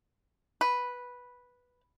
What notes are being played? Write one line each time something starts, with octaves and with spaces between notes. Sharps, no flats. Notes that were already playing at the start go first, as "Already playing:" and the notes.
B4